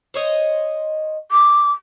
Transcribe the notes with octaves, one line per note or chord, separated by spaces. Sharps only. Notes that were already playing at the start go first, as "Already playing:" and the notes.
C5 C#5 D#5
D6